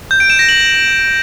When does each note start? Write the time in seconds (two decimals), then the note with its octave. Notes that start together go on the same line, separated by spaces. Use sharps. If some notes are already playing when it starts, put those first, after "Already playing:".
0.11 G6
0.20 D7
0.30 E7
0.39 A#6
0.49 F#7